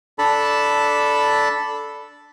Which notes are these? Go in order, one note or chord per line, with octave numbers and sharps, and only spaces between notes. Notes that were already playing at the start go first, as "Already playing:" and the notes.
D4 A4 A5 B5